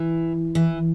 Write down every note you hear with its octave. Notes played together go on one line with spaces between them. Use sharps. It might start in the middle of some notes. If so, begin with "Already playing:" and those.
Already playing: E3
E3